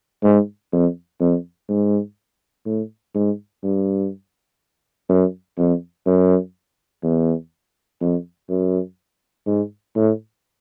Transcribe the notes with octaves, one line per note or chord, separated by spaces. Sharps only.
G#2
F2
F2
G#2
A2
G#2
G2
F#2
F2
F#2
E2
F2
F#2
G#2
A2